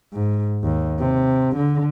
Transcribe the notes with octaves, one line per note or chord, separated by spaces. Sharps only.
G#2
D#2
C3
D3